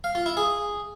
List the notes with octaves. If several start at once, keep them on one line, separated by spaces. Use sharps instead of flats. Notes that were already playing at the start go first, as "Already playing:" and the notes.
F5
F4
E4
G#4